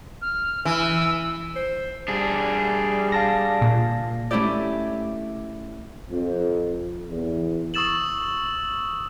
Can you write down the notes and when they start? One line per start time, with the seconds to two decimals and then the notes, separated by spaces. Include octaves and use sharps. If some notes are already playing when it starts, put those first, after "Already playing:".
0.21 F6
0.65 E3 E6
1.56 C5
2.08 G3 D4 G#4
3.12 F5 A5 A#6
3.61 A#2
4.31 A3 C#4 E4 G4 D5
6.10 F2
7.10 E2
7.74 C#6 D#6 E6 A6 E7 F#7